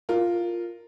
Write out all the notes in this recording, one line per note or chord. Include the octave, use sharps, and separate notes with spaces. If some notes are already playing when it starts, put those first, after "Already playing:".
F4 A#4